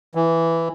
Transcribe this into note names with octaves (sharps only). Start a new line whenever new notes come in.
E3